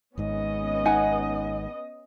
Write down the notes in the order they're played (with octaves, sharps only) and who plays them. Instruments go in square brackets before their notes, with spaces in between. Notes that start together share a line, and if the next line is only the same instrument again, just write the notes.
[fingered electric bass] G#1 G#2 [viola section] B3 C#4 D#5
[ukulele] D#4 F#5 G#5